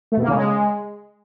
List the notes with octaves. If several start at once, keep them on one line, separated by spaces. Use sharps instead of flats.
A3
B2
A#3
C#3
G#3